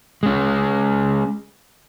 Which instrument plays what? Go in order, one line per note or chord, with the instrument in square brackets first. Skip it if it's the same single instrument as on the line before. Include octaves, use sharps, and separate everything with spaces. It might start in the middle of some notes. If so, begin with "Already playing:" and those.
[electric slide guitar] G#3 C#4